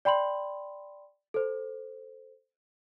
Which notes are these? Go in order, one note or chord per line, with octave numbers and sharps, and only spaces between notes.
D5 G5 B5 C6 F#7
A4 C5